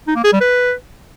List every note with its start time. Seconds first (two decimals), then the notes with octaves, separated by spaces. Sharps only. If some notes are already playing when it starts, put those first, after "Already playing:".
0.08 D#4
0.16 A#3
0.24 G#4
0.32 G3
0.41 B4